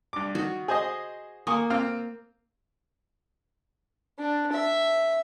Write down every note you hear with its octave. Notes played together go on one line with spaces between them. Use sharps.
G2 D6
D#3 F#4
G#4 C5 D#5
A#3 G#5 C#6 D#6
C4 F4 F6
D4
E5